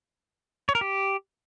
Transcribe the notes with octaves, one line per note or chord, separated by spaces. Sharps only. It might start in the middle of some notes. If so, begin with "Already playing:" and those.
C#5
A#4
G4